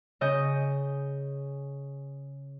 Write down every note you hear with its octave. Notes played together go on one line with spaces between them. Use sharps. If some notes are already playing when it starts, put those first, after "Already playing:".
C#3 D#5 G6